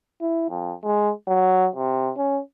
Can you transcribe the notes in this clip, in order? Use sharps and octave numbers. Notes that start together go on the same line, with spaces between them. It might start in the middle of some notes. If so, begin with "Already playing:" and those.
E4
F2
G#3
F#3
C3
C#4